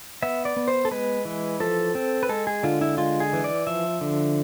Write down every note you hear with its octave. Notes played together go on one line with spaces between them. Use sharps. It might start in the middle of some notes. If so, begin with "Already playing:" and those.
B3 E5
D5
B3
C5
A4
G#3 B4
E3
F3 A4
C4
B4
G#3 A4
G#4
D3 F4
E4
G#3 F4
G#4
E3
D5
F3 E5
D3